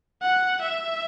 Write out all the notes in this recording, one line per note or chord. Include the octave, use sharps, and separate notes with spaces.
F#5
E5